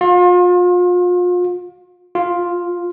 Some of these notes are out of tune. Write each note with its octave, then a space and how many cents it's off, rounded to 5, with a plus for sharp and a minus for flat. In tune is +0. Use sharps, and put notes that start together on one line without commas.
F4 +35
F4 +5